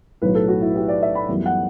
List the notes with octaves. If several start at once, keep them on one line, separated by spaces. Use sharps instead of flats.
B1 A2 F#3 B4
A4
F#4
E4
G4
D5
E5
B5
F#2 E3 G3 B3
F#5